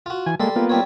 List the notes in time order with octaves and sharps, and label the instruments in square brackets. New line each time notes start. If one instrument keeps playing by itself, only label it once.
[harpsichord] F4 F#4
[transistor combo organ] E3 G#5
[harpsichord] G3 A4 C6 [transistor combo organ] G#3 A#3
[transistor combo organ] A#3 B3 F4
[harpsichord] G3 C4 C#5